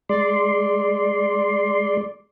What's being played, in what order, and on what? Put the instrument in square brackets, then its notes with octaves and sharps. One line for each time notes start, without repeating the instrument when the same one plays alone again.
[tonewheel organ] G#3 C6 [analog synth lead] D5